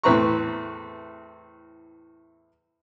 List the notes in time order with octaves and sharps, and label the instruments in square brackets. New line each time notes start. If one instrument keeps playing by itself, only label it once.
[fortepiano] E2 A2 C4 B4 A#5 C#6